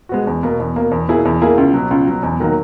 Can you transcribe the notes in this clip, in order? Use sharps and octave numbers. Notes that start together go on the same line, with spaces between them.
G#3 B3 F#4
E2
B2 A#3
E2
B2 A#3
E2
B2 A#3 E4 G#4
E2
B2 A#3 E4 G#4
C#2
B2 F#3
C#2
B2 F#3
E2
D#3 F#3 A#3